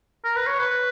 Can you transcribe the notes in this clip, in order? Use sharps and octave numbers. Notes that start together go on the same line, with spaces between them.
A#4
B4
C#5
B4